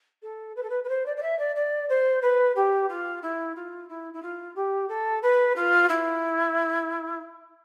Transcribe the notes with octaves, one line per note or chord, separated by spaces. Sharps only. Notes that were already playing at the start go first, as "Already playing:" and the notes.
A4
B4
A4
B4
B4
C5
D5
D5
E5
D5
D5
C5
B4
G4
F4
E4
F4
E4
E4
F4
G4
A4
B4
F4
E4